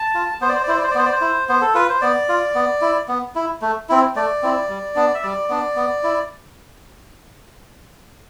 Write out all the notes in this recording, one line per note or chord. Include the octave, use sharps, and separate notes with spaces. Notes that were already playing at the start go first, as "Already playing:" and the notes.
Already playing: A5
F4
B3 C5
D5
C5
D5
E4 C5
D5
C5
D5
B3 C5
D5
C5
E4
B3 C5
A4
F4 B4
C5
B3 D5
F4
B3
E4
B3
E4
A3
C4 E4
A3 D5
C4 E4
G3
B3 D4
E5
G3 D5
B3 D4
B3
E4